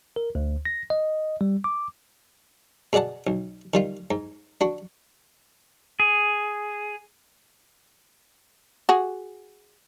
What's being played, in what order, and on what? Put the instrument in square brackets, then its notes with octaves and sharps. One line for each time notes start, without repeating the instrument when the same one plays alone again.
[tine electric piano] A#4
D2
A#6
D#5
G3
D6
[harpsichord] B2 G#4 D5 F#5 A5
B1
D#3 G3 F4
G#2
D4 F#4
[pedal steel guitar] G#4
[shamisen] F#4 G#4